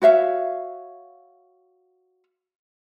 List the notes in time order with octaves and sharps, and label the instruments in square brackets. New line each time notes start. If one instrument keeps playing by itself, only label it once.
[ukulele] F#4 C#5 E5 F5